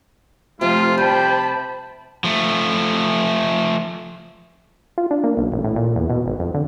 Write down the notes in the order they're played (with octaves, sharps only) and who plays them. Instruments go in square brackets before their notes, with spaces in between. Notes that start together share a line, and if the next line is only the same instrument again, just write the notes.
[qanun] C3 [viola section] F3 A3 [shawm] F4
[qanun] G3 [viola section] C5 A5 B5 [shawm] G5
[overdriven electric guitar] F3 A3
[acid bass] F4
D4
A#3
B1
A1
A2
A#2
E2
B2
G#1
F2
D3